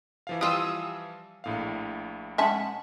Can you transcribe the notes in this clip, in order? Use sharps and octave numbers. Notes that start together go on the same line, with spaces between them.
E3 F3 F5
G3 F4 D#6 E6
A#1 A2 F5
G#3 C#4 E5 F#5 A5